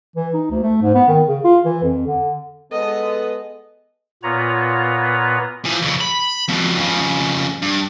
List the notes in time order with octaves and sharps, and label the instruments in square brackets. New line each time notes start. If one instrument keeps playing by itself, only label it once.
[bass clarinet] E3
D#4
D2
A3
G#2
B3
D#3
C#3
F4
E3
F2
D3
[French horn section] G#3 B3 A4 [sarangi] D#5
[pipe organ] A#2 B3 F4 B4 C#5 A#5
[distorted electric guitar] E3 F3
F2 C#3
B5
F2 B2
F2 C#3
G2